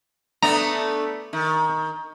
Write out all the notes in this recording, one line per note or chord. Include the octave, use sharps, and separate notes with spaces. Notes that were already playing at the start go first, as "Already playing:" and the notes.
A3 B3 D4 A#5
D#3